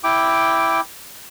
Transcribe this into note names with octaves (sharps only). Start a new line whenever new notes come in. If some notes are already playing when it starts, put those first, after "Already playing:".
E4 G5 D6